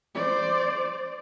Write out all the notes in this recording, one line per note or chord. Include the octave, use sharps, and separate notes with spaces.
C5 D5